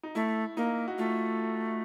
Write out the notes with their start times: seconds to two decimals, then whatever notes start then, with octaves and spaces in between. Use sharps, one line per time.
0.03 D#4
0.15 A3 E4
0.57 A#3 D#4
0.88 F#4
0.98 A3 F4